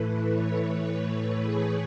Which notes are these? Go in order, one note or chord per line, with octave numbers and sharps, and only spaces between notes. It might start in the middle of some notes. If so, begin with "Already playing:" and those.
Already playing: A2 E3 A3 B4
C#5
C#5
B4
G#4